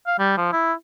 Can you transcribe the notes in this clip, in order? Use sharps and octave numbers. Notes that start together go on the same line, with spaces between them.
F5
G3
F3
E4